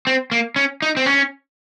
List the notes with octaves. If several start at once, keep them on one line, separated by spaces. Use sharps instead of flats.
C4
A#3
C#4
D#4
C4
C#4